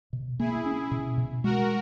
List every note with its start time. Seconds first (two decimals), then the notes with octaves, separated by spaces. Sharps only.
0.13 B2
0.39 A#3 E4 G#4
0.66 C#4
0.91 B2
1.18 B2
1.44 G#3 F#4 A#4